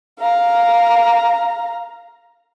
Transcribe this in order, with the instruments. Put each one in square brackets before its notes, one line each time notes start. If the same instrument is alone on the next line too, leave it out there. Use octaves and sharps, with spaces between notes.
[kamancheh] F5 A#5